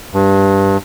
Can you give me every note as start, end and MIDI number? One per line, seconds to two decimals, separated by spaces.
0.14 0.77 43